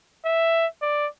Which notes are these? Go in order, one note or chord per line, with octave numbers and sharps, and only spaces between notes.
E5
D5